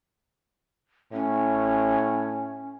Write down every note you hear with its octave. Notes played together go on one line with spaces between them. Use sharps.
A2 C#4